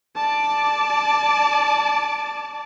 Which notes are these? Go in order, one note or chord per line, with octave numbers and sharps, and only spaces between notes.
D5 A5